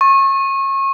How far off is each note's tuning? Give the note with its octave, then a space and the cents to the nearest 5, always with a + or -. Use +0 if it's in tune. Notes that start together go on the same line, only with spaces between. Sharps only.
C#6 -30